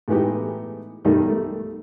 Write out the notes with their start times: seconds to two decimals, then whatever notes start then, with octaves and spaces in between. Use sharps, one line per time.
0.08 A2 E3 G#3 B3 D#4 G4
1.05 B1 D#3 G3 A3 D#4
1.29 A3